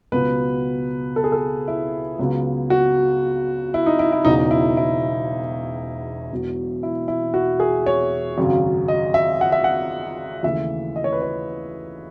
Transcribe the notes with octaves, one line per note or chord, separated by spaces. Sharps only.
C#2 B2 F#3 B3 B4
A4
G#4
A4
E4
C#2 C#3 F#3 B3
F#4
E4
D#4
E4
E4
E1 E2 C#3 F#3 D#4
E4
E4
E1 E2 B2 F#3
E4
E4
F#4
G#4
C#5
G#1 F#2 C#3 F#3
D#5
E5
F#5
E5
F#5
D#2 C#3 E3 A3 E5
D#5
C#5
B4
C#5